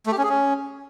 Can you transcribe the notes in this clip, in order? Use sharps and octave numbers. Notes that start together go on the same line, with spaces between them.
A3
G4
C#4
G#4
C#4